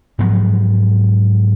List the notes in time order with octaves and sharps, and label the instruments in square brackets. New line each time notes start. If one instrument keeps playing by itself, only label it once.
[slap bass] G#2 F3 F#3 B3